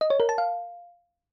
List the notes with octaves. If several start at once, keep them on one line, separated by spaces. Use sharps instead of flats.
D#5
C#5
A#4
A5
F5